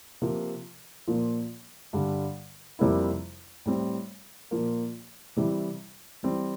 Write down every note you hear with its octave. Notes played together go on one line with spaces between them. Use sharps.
C3 F3 A#3
A#2 F3 A#3
G2 D3 G3
F2 C3 G3 A#3 E4
A2 G3 C4
A#2 F3 A#3
C3 E3 G3
E3 G3 C4